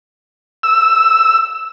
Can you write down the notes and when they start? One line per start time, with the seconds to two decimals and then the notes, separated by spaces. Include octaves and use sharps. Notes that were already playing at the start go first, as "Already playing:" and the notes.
0.63 E6